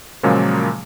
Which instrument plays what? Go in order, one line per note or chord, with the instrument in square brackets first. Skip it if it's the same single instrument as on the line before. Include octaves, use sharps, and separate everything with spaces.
[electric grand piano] A#2 C#3 F3 F#3 G#3 A#3